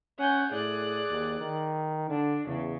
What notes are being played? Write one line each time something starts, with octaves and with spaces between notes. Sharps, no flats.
C#4 F#5 G#5 G6
A2 G#4 D5 F#6
D#2
D#3
D3 D4
E2 C#3